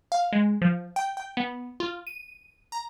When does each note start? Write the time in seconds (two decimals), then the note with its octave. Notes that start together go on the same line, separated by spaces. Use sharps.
0.12 F5
0.33 G#3
0.62 F3
0.96 G5
1.17 G5
1.37 B3
1.80 F4
2.07 D#7
2.72 A#5